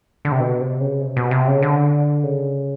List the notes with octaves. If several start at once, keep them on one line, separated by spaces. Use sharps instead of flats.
D3
C3
B2
C3
C#3
C3
B2
C3
C#3
D3
C#3